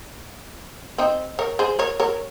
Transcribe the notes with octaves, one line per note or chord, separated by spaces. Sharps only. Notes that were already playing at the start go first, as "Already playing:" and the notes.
C4 D#4
A#4 C#5
G#4 C5
A#4 C#5
A#4 C#5